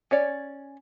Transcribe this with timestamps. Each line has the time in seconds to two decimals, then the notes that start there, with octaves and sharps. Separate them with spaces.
0.11 C#4 C#5 D5